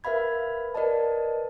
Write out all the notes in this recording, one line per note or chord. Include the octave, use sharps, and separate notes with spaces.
A#4 B4 E5 F5 B5 G#6
A#4 B4 D5 D#5 A5